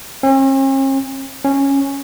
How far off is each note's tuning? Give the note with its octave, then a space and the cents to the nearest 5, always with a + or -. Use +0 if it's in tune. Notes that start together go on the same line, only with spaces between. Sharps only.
C#4 -45
C#4 -5